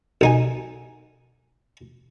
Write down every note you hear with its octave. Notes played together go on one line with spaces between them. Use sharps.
B1 D#4 G#5